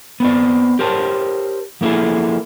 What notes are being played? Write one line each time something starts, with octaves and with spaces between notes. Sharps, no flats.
B3 C4 D5
G4 A#4 C5 C#5 A5
F3 A#3 E4 G#4 A4